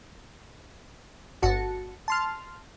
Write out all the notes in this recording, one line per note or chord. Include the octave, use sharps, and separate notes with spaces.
G1 F#4 A5 C#7
A5 C6 F6